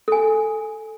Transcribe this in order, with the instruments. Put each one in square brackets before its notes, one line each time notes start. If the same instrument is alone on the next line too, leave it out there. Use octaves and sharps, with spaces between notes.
[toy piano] A4 G#5